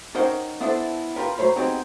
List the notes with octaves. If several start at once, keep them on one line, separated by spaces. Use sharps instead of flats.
C#4 D#4 A#4 C5 F#5 G5
B3 D4 E4 A4 C5
F4 G4 A#4 B4
F#3 C5 C#5 B5
B3 C4 D#4 G4 G#4